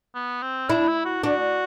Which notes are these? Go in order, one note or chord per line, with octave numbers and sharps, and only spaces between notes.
B3
C4
D4 E4
E4
F#4
D4 F#4